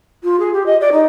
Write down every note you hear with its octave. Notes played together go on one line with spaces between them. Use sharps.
F4
G#4
G4
D#5
D5
D#4